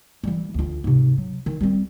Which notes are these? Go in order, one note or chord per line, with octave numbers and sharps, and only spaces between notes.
E3 G3
D2 F4
G#2 C3
F#3
D#3
G3 C4